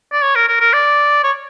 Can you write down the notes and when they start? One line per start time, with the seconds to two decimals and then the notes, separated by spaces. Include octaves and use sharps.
0.12 D5
0.22 C#5
0.35 A#4
0.48 A#4
0.61 A#4
0.74 D5
1.24 C#5